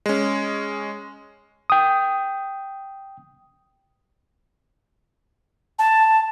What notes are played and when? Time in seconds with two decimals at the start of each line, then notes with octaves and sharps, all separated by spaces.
0.06 G#3 C#4
1.70 G5 D#6
5.79 A5